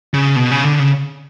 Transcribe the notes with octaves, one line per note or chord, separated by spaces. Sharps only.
C#3
B2
C#3
D3
C#3